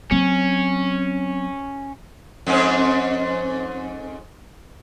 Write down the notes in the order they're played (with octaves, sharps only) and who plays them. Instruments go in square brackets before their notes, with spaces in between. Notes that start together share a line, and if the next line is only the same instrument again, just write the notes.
[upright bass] F#3 C4 [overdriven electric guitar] C#4
[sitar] F2 G#2 C#4